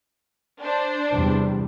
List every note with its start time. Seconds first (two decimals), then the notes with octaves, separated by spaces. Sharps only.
0.61 D4 C5
1.13 E2 C3 G3